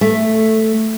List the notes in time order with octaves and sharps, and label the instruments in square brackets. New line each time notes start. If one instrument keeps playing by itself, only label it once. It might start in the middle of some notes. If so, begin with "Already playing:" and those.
[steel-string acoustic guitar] A3